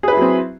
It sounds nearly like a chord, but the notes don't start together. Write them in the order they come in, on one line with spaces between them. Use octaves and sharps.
G#4 B4 E4 F#3 C4